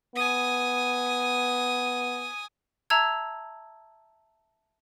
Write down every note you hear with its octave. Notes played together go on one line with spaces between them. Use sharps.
B3 G#5 D#6
E5 A5 A#5 E6 G#6